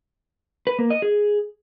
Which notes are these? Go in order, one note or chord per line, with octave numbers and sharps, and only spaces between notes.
B4
A#3
D#5
G#4